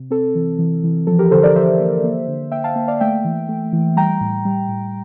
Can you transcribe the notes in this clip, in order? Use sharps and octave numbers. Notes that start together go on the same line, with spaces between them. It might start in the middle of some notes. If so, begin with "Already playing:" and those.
Already playing: C3
C4 A4
E3
E3
E3
F3 A4
G4 A#4
D3 A4 C5
A#4 D5
F3 C5 E5
A#3
A#3
D3
A#3 E5 G5
F5 A5
A#3
D5 F5
A3 E5 G5
E3
A3
E3
G3 G5 A#5
A2
G3
A2